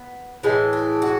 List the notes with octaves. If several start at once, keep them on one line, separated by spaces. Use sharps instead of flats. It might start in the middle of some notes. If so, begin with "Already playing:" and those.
Already playing: B3
A2 E3 G#3
D4
F#4